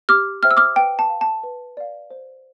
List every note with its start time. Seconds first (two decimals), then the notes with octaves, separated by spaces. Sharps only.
0.09 G4 D6 F6
0.43 C5 E5 G5 F6
0.51 E6
0.57 D6 F6
0.76 B4 G5
0.99 A5
1.10 F5
1.21 A5
1.43 B4
1.77 D5 F5
2.10 C5